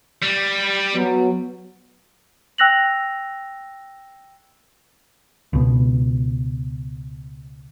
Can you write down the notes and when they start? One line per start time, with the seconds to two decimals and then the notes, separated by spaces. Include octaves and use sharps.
0.23 G3
0.94 F#3 B3
2.58 G5 E6 F#6 A#6 F7 F#7
5.53 C#2 B2